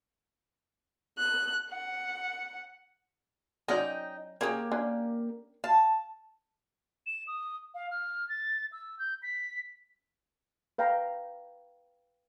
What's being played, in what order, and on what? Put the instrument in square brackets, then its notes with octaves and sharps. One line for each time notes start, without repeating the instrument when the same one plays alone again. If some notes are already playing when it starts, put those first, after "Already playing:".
[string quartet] F#6
F#5
[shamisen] F#3 C#4 D5 [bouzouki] D#4 D#5 G5
[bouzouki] A#3 G4 [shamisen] C#4 G#4 A#4
[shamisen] C#4 D4
[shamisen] F5 [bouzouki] A5
[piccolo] E7
D#6
F5
F6
A6
E6
G6
B6
[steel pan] B4 F5 G5 A#5